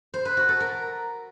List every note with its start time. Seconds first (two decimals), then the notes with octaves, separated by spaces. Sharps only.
0.14 C5
0.25 B4
0.37 F#4
0.49 A4
0.60 A#4